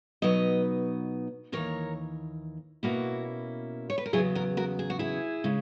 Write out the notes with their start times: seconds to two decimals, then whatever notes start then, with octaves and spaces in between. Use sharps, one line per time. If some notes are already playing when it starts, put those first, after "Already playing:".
0.22 B2 F#3 B3 D#4 B4 D#5
1.52 D#2 C#3 E3 A#4 C#5
2.83 B2 A#3 C#4 E4 F#4
3.90 C#5
3.98 B4
4.06 A#4
4.13 E2 C#3 F#3 B3 E4 G#4
4.35 F#4 A#4
4.57 F#4 A#4
4.79 G#4
4.90 F#4
4.99 E4 G#4
5.44 C#3 G#3